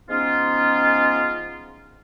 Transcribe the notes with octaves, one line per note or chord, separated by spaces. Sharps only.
F3 G#3 B3 C#4 D#4 F4